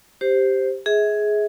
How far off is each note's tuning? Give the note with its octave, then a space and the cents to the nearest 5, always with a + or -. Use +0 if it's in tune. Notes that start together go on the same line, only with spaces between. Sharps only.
G4 +0 C5 +0
G#4 +10 E5 -35